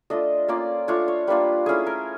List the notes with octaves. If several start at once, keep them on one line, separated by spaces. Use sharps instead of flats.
A3 D4 F4 D#5
A#3 C#4 F4 D5
A3 D4 F4 C#5
C#5
G3 A#3 D4 F4 B4
A3 C#4 E4 G#4
A#4